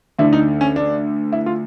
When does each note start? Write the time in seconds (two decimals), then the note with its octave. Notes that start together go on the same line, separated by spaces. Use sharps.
0.19 D2 D3 E4
0.33 D#4
0.61 C#4
0.76 D4
1.32 E4
1.46 F4